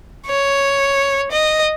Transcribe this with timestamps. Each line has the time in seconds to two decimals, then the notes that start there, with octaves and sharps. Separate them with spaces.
0.27 C#5
1.32 D#5